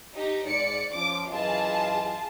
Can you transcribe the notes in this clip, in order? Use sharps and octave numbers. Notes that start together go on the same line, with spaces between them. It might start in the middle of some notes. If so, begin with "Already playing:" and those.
D#4 G4
G#2 D5 C#7
F3 C#4 D6
F#2 E3 F4 G#4 D#5 A5